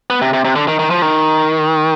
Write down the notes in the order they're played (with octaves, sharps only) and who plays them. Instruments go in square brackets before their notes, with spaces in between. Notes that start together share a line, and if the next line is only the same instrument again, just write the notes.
[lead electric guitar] B3
C3
C3
C3
D3
D#3
D#3
F3
D#3